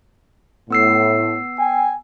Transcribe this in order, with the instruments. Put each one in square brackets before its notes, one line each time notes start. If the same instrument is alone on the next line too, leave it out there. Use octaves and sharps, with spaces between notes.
[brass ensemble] A2 [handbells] B3 E6 C7
[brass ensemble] G5 G#5